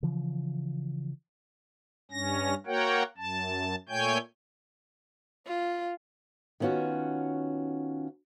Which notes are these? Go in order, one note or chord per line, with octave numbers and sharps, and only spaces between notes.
C#3 E3 F3
G2 C#4 A#6
A#3 F#4 A#4 C#5 F#5 G5
F#2 A5
A#2 A3 C#5 G5 G#5 G6
F4
D#3 B3 C#4 F4 F#4